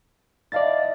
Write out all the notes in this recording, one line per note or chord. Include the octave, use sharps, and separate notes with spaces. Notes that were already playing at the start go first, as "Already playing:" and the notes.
E4 D5 D#5 F5 A5 A6